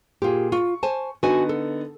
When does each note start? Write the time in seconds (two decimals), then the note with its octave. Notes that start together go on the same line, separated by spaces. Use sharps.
0.22 A#2 F4 G4 G#4
0.52 F4 C#6
0.83 C5 G#5 A5
1.23 D3 B3 D#4 F#4 G#5
1.49 A4